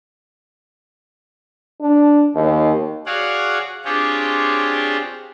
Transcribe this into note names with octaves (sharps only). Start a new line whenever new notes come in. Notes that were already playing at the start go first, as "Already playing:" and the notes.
D4
D#2
F#4 G#4 C#5 D5 F5 F#5
C4 D4 F4 G4 G#4 C#5